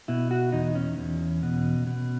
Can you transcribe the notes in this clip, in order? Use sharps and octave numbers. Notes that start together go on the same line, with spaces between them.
B2 E4
F#4
E2 D#4
C#4
E2
B2
B2